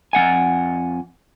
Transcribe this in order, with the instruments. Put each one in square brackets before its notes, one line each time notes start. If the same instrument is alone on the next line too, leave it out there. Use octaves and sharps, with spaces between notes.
[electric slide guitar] F2 A#3 F#5 G#5